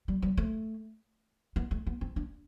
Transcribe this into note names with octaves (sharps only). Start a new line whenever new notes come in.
G3
G3
A3
B3
A3
B3
C4
D4